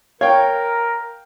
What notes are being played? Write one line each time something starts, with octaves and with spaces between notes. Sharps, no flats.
A#4 C#5 F5 G5